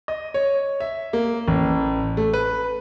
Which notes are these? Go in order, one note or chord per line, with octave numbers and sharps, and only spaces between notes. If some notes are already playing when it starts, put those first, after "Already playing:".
D#5
C#5
E5
A#3
A1
A3
B4